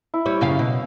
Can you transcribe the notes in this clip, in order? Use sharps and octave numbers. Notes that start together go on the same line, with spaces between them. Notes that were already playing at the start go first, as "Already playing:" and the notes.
E4
G3 C#5
F#2 C#3 F5
B2